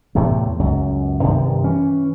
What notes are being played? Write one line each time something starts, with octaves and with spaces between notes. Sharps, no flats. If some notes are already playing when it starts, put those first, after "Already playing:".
E2 A2 C3 A3
C#2 F#2
G2 C3 D#3
E3 C#4